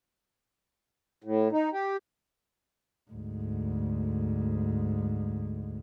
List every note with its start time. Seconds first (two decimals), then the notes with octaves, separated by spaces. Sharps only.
1.24 A2
1.52 D#4
1.73 G4
3.11 D2 G#2